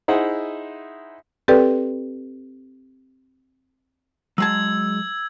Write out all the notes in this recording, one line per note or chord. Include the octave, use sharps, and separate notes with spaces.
D#4 E4 G#4 C5 E5 F#5
C4 G4 A4 B4 D5 G5
F#3 G#3 A5 E6 G#6